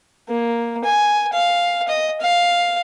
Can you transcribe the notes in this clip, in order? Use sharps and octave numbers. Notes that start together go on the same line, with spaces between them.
A#3
G#5
F5
D#5
F5